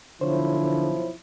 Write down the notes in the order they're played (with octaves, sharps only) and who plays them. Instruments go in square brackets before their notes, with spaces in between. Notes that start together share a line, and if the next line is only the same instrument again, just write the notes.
[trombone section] B1 F3 E4 [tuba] D3 [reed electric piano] C5 C#5